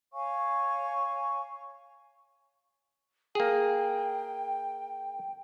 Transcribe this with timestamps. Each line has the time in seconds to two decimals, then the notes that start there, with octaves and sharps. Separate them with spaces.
0.13 C#5 F5 G#5 C#6
3.35 A#3 G#4 G5